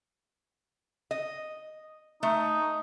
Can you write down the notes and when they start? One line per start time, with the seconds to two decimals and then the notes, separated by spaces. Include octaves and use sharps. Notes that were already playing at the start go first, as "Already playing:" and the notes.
1.11 D#5
2.23 A3 D#4